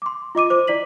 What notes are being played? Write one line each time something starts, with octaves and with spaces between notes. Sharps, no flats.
C6 D6
F4 D#5 D6 D#7
C5 D6
E4 D5 B6 F#7